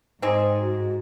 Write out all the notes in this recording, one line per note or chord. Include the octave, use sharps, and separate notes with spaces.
G#2 C4 D#4 G#4
F#4